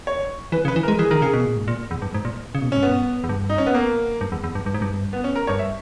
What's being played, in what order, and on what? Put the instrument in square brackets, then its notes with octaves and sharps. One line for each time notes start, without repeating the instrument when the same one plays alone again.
[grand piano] C#5
[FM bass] E3 [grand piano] B4
[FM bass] C#3
[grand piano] B4
[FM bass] E3
[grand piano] A#4
[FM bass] G#3
[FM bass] E3 [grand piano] G#4
[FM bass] D#3 [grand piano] A#4
[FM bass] C#3 [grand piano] G#4
[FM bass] B2
A#2
G#2
A#2
E2
G2
G#2
A#2
C#3
B2
A#2
[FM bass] G#2 [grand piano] C#4
[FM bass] G2 [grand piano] B3
[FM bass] E2
G2
[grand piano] D#4
C#4
B3
A#3
[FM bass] G2
E2
E2
G2
G2
G#2
G2
[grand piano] B3
C#4
A#4
[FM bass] G2 [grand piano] C#5
[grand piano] E5